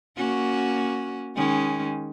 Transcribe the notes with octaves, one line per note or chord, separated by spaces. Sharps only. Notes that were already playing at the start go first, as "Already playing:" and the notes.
A#3 C#4 F#4
D#3 G#3 C#4